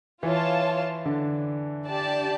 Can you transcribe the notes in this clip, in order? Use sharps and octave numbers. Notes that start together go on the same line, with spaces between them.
E3 E4 F4 C#5 F5 A5
D3 D4
D4 G4 D5 A5